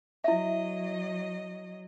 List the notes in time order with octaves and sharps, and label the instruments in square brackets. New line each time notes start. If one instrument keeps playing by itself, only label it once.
[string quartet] F#3 D#5 [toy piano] E4 E5